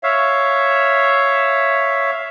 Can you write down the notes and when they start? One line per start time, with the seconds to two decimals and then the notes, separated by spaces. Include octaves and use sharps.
0.03 C#5 E5 F5